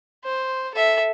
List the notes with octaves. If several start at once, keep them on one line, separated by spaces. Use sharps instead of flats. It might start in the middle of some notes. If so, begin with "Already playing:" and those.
C5
A4 E5